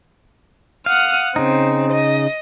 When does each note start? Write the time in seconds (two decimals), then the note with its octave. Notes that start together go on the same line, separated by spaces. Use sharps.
0.86 F5 F#5 D#6 F6
1.36 C#3 C4 D#4
1.92 D#5